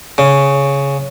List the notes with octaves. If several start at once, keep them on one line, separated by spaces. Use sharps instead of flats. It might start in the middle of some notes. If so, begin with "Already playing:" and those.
C#3